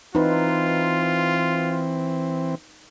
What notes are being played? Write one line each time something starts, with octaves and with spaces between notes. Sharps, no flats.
E3 C4 D#4 F4 B4